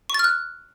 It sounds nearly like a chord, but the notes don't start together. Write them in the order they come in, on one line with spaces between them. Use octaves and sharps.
C#6 A6 F6 F#6